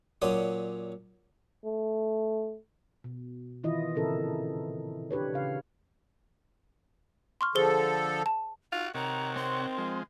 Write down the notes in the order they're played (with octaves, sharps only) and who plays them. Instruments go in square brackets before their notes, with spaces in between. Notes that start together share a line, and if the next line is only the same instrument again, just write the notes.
[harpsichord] A#2 F#3 C#4 C5 D5 D#6
[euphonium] A3
[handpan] B2
D#3 E3 E4 F4 D#5
A#2 C#3 C4 E4 A4 A#4
D4 G4 B4 C#5
C#3 F5
[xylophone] C6 C#6 F6
[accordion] D3 F3 A4 [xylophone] G#4 C5 G7
[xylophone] A5
[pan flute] D#4 [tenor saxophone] F4 [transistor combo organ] F#4
[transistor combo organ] C3 C#5 F#5 [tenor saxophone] D#3 [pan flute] A#5
[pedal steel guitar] C4 [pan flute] C6
[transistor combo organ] F3 G#3